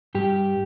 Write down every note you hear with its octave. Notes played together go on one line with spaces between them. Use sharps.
G2 G4